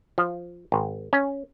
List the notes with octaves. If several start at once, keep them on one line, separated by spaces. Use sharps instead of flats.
F3
G#1
C#4